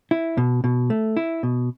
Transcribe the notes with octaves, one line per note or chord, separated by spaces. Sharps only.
E4
B2
B2
A3
E4
B2